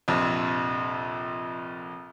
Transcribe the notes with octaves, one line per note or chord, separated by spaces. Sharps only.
A#1 F2 C3